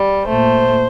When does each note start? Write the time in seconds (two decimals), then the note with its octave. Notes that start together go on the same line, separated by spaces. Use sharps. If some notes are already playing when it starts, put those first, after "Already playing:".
Already playing: G3
0.26 A#2 A3 C5